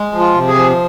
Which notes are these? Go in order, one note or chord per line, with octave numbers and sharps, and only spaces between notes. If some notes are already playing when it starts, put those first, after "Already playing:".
Already playing: G#3
F3
F4
C3
G#4
F3